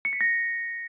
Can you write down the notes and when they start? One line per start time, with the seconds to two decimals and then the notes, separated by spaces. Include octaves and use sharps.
0.05 C#7
0.13 B6
0.21 A#6